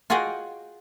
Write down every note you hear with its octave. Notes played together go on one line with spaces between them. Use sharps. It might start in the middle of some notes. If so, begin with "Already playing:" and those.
F4 F#4 G#4 D#5 F#5 G5